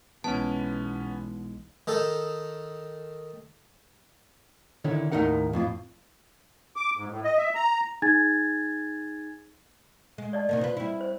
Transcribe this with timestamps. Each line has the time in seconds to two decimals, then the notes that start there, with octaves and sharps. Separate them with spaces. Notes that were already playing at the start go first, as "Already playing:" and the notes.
0.24 B1 E3 G#3 B3 C#4 A5
1.87 D#3 D#4 A4
4.84 D3 D#3 E4 C#5
5.12 D#2 A2 D#4 A#4 F#5
5.53 F2 A2 F4
6.76 D6
6.97 G#2
7.10 A2
7.24 D#5
7.37 E5
7.55 A#5
8.02 D#4 G#4 G#5 G#6 A6
10.18 G#3
10.33 D5 D#5 A5
10.49 C3 D#3 A#3
10.61 F4 B4
10.77 G3 E4
11.01 C5